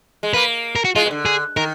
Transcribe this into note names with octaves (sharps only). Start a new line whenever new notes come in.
G#3
A#3 B4
A#4
F#4
G#3 F4
B2
D3
G#4
D#3 A#4